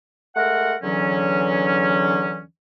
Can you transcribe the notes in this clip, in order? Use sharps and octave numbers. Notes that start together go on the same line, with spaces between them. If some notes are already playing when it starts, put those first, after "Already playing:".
G#3 A3 A#4 F#5
E2 D3 E3 F#3 C#4